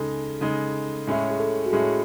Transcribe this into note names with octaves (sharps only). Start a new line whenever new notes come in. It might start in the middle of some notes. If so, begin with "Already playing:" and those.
Already playing: C#3 G#3 D#4 A4
C#3 G#3 D#4
A2 G#3 C#4 E4
G#4
A4
F#4
A2 G#3 C#4 E4 G#4